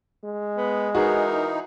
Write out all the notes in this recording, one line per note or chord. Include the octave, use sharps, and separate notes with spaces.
G#3
B3
E3 D#4 F#4 G#4 A#4